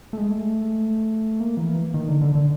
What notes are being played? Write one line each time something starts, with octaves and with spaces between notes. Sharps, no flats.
A3
G#3
A3
A#3
E3
D#3
D3
D3
D3